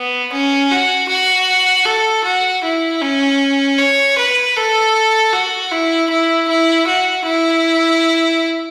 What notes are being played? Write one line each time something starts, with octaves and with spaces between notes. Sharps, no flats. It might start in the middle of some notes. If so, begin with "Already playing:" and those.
Already playing: B3
C#4
F#4
F#4
A4
F#4
E4
C#4
C#5
B4
A4
F#4
E4
E4
E4
F#4
E4